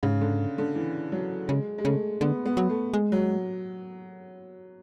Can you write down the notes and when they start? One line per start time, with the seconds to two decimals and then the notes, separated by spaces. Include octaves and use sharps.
0.03 G#2 C#3
0.21 D3
0.58 D3
0.75 E3
1.12 F#3
1.48 C#3 G#3
1.78 G#3
1.85 C#3 A3
2.21 D3 B3
2.46 B3
2.57 F#3
2.69 A3
2.94 G#3
3.12 F#3